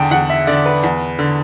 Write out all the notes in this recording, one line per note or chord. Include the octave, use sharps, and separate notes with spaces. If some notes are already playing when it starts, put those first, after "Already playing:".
Already playing: E2 D3 G5 A5
E2 F#5
E5
D3 D5
B4
E2
D3